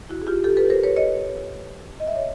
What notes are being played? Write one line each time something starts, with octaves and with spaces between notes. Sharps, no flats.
E4 F#4
G#4
F4 G4
G4 A4
A4 B4
A#4 C5
B4 C#5
C#5 D#5
D#5
E5
C#5 D#5